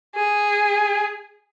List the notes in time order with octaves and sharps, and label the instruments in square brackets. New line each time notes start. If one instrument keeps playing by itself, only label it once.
[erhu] G#4